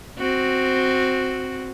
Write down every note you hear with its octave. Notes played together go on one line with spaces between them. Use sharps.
C4 F#4